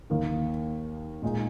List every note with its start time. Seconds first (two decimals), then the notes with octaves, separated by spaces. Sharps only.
0.10 D#2 D#3 A#3
1.22 A#2 G#3 D#4 G#4